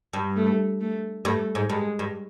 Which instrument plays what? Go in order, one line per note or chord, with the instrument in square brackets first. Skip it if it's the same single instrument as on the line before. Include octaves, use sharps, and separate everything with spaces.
[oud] G2
[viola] A3
A3
[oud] G2 [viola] A3
[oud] G#2
[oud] G2 [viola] G#3
[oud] G2